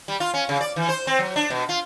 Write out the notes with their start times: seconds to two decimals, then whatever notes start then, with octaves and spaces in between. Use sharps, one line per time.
0.08 G3
0.20 F4
0.34 C#4
0.49 C#3
0.61 D5
0.76 E3
0.89 C5
1.07 C4
1.19 F#3
1.36 D4
1.50 B2
1.69 F4